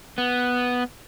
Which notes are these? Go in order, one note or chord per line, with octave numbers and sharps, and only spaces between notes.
B3